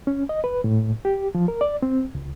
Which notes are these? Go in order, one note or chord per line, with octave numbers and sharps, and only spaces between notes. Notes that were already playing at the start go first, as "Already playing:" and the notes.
C#4
D#5
B4
A2
G4
F3
A#4
D5
C4
C#2